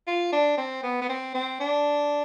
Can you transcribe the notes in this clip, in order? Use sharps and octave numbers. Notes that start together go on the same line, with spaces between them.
F4
D4
C4
B3
B3
C4
C4
D4